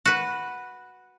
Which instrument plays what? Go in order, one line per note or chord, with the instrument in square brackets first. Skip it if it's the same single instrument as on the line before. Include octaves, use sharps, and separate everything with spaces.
[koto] F#4 B4